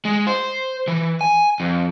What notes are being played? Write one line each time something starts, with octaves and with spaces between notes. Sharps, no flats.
G#3
C5
E3
G#5
F2